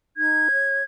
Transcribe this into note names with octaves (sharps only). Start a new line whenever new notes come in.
D#4 G#6
C#5